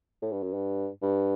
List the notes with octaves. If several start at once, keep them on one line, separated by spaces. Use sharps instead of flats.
A2
G2
F#2
G2
G2